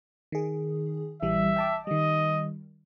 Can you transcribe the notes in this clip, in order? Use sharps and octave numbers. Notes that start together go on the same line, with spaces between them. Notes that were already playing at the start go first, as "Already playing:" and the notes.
D#3 G#4
A#1 E3 G3 E5
G5 A5 D6
D#3 G3 D#5